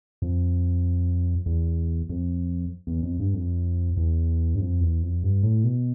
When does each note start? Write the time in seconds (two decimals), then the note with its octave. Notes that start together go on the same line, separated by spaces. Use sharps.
0.22 F2
1.46 E2
2.10 F2
2.87 E2
3.03 F2
3.20 G2
3.34 F2
3.97 E2
4.55 G2
4.60 F2
4.81 E2
5.02 F2
5.23 G2
5.43 A2
5.64 B2